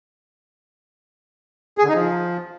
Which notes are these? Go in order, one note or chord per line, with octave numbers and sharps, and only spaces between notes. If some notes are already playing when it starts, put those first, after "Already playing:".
G#4
D3
D#4
F3